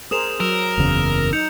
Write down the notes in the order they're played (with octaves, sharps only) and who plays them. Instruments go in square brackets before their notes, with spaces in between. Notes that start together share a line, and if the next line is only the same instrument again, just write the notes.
[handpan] G#4 A#4 C5 [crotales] D#6 E7 F7
[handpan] F#3 [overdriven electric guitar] A#4 [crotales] E6 E7
[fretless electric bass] F#1 E2 C#3
[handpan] D#4 [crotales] G6 C#7 F7